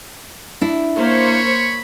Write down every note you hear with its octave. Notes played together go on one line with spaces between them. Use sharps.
D4 E4
A#3 C5 C#5 B5 C#6